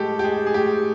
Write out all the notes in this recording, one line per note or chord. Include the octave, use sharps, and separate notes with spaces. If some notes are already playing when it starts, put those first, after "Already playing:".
Already playing: A2 G#3 G4 A4
G4
G#3 G#4
G#4
A2 G4